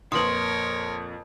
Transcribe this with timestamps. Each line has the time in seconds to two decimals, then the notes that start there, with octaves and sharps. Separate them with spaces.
0.12 F2 A#2 A#4 B4 C#5 C6 D#6